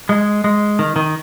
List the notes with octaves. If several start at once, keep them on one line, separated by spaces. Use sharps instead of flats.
G#3
G#3
D#3
D#3